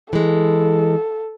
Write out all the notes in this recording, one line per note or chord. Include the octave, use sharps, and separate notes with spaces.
E3 G#3 A4